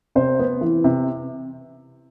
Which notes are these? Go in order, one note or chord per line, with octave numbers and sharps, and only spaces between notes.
C3 C5
B3
E3
C3